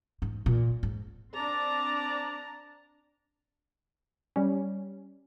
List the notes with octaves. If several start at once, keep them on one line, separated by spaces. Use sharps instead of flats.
G#2
A#2
G#2
C4 D4 D5 A5 A#5
G3 C#4